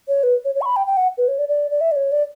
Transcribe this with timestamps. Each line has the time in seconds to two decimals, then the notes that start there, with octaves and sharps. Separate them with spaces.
0.08 C#5
0.23 B4
0.45 C#5
0.55 C#5
0.61 C#6
0.66 B5
0.76 G5
0.87 G5
0.97 F#5
1.18 B4
1.28 C#5
1.39 D5
1.49 D5
1.71 D5
1.81 E5
1.92 D5
1.96 C#5
2.12 D5